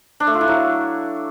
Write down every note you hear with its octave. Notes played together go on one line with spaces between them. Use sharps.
D4
A3
F4
E4
F#3